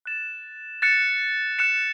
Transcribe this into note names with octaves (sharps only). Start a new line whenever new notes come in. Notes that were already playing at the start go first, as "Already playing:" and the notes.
F#6 A6 E7
F#6 A6 C#7 E7
F#6 C#7 E7